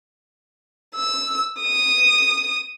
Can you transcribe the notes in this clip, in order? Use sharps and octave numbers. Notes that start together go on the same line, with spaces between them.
E6
D#6